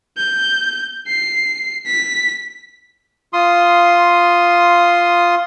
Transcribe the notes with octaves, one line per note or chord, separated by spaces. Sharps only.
G6
C7
B6
F4 C6 D#6